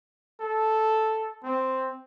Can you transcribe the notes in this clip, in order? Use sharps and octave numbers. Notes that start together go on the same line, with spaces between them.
A4
C4